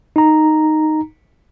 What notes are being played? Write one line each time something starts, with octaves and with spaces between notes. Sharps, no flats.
D#4 A#5